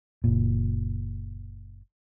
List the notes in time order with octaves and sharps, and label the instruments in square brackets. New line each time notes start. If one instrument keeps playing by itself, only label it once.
[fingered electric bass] F#1 A#2